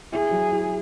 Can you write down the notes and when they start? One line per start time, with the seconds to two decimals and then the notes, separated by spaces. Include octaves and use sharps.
0.12 E4 G#4
0.31 F#3
0.50 E4